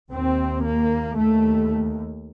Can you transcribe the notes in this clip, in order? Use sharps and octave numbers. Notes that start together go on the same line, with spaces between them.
D#2 C4
A#3
D#2 A3